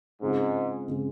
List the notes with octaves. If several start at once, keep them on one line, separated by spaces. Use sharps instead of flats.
G#2 C#3 G#3 C4 F4
C#3 G#3 C4 F4